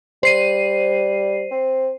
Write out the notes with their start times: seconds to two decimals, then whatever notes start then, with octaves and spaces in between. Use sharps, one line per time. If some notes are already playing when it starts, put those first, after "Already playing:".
0.23 G3 C5 C7 D#7
1.51 C4